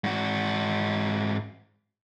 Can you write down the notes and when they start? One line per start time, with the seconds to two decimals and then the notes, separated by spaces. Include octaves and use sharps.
0.04 G#2 F#4